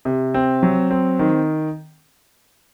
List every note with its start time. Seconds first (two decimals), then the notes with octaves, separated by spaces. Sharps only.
0.05 C3
0.34 C4
0.63 F#3
0.91 C4
1.19 D#3